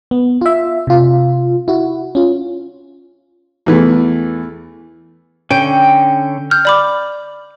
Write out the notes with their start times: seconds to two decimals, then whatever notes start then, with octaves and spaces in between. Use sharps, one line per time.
0.11 B3
0.41 F4 E5
0.87 C3 F4
1.68 E4 F#4
2.15 C#4 F4
3.66 E2 E3 A3
5.51 D3 C#4 G5
6.51 F6 G6
6.65 D5 B5 D6